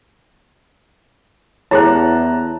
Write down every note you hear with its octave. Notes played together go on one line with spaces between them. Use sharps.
E2 E4 G4 G#4 C#5 A5 A#5 F#6